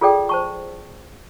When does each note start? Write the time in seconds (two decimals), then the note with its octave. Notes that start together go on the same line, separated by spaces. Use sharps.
0.01 F4 G#4 A4 D5 G5
0.29 C5 A5 C#6